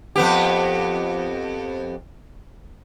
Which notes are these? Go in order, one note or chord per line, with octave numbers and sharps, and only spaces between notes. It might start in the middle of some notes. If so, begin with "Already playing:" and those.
F2 B3 G4